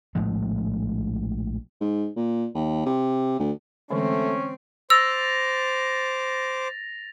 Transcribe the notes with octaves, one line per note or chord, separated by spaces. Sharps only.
A#1 A2 F3 G#3
G#2
A#2
D#2
C3
D2
D3 E3 G#3 A3 C4 C#4
C5 D6 E6 A6 A#6 F7